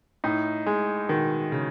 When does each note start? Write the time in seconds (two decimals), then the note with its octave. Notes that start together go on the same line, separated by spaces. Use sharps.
0.24 A2 D#4
0.66 G#3
1.09 B2 D#3
1.52 C#3